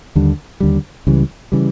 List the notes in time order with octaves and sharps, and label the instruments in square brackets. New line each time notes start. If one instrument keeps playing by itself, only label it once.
[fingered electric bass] D#2 D3 G3
D#2 D3 G3
C#2 C#3 E3 G3
C#3 E3 G3